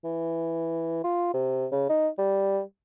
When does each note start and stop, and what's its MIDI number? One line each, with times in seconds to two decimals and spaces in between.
0.04 1.04 52
1.04 1.31 65
1.34 1.66 48
1.72 1.86 49
1.89 2.08 63
2.19 2.60 55